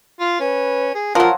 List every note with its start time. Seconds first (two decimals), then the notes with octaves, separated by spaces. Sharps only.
0.20 F4
0.40 C#4 B4
0.95 G#4
1.15 F3 F#3 F4 A#4